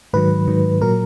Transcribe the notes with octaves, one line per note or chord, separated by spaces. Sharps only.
G#2 D#3 F#3 B4
G#2 D#3 F#3
A#2 F#3 A#4